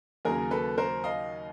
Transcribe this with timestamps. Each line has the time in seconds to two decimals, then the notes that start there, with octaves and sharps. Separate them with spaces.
0.25 D#2 C#3 F#3 A#3 G#4 A#4
0.51 A4 B4
0.78 A#4 C5
1.04 D#5 F5